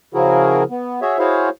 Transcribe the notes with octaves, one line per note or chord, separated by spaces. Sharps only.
C#3 F3 E4 F#4 G#4 A#4
B3
F#4 G#4 C#5 E5
E4 F#4 G#4 C5 C#5 F5